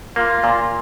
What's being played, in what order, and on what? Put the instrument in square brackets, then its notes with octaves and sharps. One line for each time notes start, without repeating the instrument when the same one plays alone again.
[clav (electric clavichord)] A#3 [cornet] F4
[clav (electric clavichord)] A#2